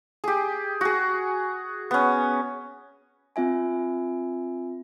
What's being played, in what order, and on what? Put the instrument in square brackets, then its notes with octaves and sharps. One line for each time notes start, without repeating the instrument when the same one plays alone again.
[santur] G4 G#4
F#4 G#4
B3 C#4
[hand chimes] C4 F4 E5 G#5